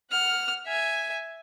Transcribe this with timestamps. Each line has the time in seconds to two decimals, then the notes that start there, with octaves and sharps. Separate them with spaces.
0.11 F#5 F6
0.66 E5 G#5